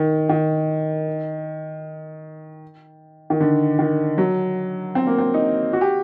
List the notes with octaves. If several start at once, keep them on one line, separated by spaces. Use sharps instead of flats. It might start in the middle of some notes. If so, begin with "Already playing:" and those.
Already playing: D#3
D#3
D#3
D3
D#3
F#3
C4
A#3
C4
D#4
F#4
G4